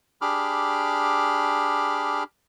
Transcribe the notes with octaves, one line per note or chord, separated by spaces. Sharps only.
D4 G4 G#4 B5 D6 F6